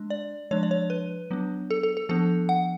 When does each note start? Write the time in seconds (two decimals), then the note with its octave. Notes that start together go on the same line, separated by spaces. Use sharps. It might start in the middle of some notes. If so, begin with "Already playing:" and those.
Already playing: G#3 D4
0.10 D5
0.51 F3 G#3 D4 C#5
0.63 D5
0.71 C#5
0.90 B4
1.31 F#3 B3 D4
1.70 A4
1.83 A4
1.97 A4
2.09 F3 B3 D4 A4
2.49 F#5